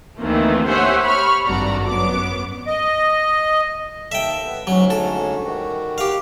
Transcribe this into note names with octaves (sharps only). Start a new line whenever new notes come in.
D2 D#3 E3 A3 A#3 C4
G4 C5 C#5 E5 F#5 G#5
B5 C#6 F6
G#1 G2 F#4 A4 D5 A#5
F#2 B3 D6
D#5
D#2 A4 E5 G5
B3
D2 G#2 F#3 C#4
A4
D#3 G3 F#4
G4 F5